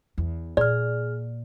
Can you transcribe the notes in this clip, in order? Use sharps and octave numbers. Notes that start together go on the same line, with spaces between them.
E2
A#2 G#4 D5 F6